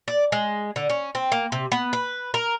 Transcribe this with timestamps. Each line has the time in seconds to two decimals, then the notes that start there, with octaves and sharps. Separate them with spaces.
0.08 D5
0.32 G#3
0.76 D3
0.90 C#4
1.15 C4
1.32 A#3
1.52 C3
1.72 B3
1.93 B4
2.34 A#4